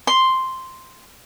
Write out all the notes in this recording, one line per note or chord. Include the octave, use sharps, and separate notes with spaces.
C6